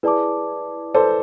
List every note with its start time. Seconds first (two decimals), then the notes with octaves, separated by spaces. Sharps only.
0.03 E4 G#4 B4 D5 A5 D6
0.94 A4 B4 C5 D5 A5 D6